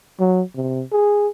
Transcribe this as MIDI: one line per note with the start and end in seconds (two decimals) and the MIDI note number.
0.20 0.42 54
0.56 0.83 48
0.92 1.28 68